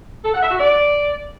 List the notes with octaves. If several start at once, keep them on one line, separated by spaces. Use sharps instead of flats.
A4
F#5
E5
F#4
D5